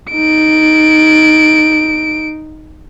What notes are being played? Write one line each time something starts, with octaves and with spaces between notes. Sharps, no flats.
D#4 D7